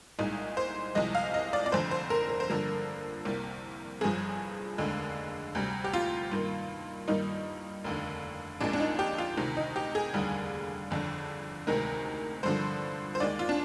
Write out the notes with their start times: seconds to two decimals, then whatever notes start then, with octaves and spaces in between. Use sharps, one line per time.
0.19 C2 A#2 G#3 D#4
0.57 C5
0.95 C2 C3 F3 G#3 D#5
1.15 F5
1.34 D#5
1.53 D5
1.66 D5
1.71 F1 F2 D3 C5
1.91 C5
2.10 A#4
2.29 A#4
2.40 C5
2.48 G2 D3 F3 A#3 A#4
3.25 C2 C3 G3 A#3
4.01 G1 G2 F3 G#4
4.78 F1 D#2 D3 G#3
5.55 D2 C3 G3
5.84 G4
5.94 F4
6.31 G2 D#3 A#3
7.08 G2 D#3 G3 A#3 D#4
7.84 F1 D#2 D3
8.60 A#1 A#2 G#3 D4
8.73 D4
8.80 D#4
8.99 G4
9.18 F4
9.37 D2 C3 D#3
9.57 D#4
9.76 G4
9.95 G#4
10.14 F1 D#2 D3 G3
10.91 G1 F2 D3
11.67 D2 C3 D#3 G#3 A#4
12.43 G2 D3 F3 C5
13.15 C5
13.20 D#2 D#3 G#3 D5
13.39 F4
13.49 D4